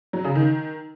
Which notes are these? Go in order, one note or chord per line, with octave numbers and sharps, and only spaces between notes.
F#3
C#3
D#3